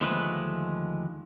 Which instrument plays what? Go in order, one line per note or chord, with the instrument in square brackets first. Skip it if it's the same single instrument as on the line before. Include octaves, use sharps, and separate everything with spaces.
[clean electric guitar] D#2 D3 F3 G#3 A3 B4